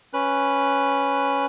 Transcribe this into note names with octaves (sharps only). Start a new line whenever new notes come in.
C#4 B4 F#6